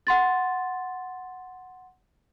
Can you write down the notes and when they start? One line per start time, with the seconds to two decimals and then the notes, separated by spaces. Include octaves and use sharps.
0.07 F#5 C6 A6